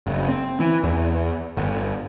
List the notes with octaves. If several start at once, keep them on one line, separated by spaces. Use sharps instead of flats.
F#1
C4
E3
E2
G1